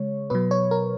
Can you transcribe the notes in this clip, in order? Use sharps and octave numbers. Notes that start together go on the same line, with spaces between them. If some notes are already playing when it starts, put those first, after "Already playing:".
Already playing: C#3 G#3 C#5
B2 F#3 B4
C#5
A#4